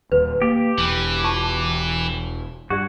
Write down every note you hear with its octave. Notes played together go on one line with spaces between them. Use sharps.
D#1 D#2 B4
A#3 G4
E1 E3
F4 A5 C#6
G2 F#4 G4 D5